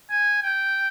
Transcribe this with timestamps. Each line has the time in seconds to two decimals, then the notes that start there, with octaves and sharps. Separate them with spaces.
0.10 G#5
0.43 G5